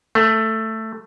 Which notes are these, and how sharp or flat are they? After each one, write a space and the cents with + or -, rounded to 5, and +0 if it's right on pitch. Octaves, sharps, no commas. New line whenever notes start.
A3 +10